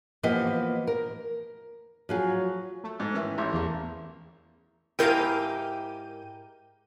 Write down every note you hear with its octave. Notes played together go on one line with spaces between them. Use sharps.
E3 F3 A#3 B3 G4 D#5
A#4
F3 F#3 G#4
A3
G#2
D#3 E3 C#4 E4
A1
E2 A#3
G#2 E4 G4 A#4 F5 G6 D#7